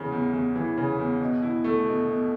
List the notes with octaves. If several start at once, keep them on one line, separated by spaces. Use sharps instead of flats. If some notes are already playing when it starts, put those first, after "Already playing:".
Already playing: E2 C#3 E3
E2
E2
E3
C#3
E2
B2
E4
A3
B2
B2